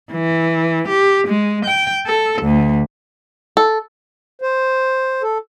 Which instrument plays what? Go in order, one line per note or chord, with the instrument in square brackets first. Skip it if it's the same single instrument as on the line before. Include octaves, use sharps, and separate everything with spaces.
[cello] E3
G4
G#3
G5
A4
D2
[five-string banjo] A4
[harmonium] C5
A4